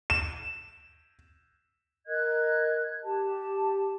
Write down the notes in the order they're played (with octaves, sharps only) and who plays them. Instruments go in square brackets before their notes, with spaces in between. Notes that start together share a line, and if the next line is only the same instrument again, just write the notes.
[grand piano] E7
[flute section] A#4 D#5 F#6 G#6
G4 A5